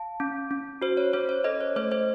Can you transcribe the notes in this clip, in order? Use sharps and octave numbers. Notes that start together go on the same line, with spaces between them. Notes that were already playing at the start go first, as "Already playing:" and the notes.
Already playing: F5 A5
C#4
C#4
F#4 C5
C#5
C#4 C5
C#5
A4 C5 D#5
C#5
A3 C5 D#5
C5 D#5